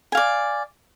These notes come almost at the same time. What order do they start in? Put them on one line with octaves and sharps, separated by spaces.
G#5 F5 D5